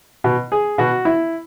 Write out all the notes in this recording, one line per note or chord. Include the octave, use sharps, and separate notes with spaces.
B2
G#4
B2 F#4
E4